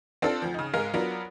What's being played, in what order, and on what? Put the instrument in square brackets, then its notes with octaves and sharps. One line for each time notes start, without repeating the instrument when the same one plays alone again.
[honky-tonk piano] C4 D4 F4 A4
D2 F3
C#3 D#4
G#2 G#3 A#4 F5
F#3 B3 D4 F4 A#4